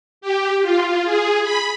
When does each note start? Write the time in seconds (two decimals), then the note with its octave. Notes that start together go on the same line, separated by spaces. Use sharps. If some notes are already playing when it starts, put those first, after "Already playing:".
0.21 G4
0.62 F4
1.04 G#4
1.43 B5